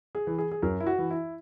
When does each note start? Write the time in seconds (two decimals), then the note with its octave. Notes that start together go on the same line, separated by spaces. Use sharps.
0.15 G#4
0.27 E3
0.38 G#4
0.51 G#4
0.62 F#2 A#4
0.80 E4
0.86 F#4
0.98 E3
1.10 E4